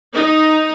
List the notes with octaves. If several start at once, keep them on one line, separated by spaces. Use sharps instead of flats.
D#4